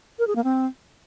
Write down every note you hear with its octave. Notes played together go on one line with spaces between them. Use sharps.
A#4
G#4
A#3
C4